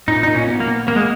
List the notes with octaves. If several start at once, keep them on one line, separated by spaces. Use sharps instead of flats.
A#2 D#4
A#2 D#4
C#4
B3
A#3
B3
A#3 B3
G#3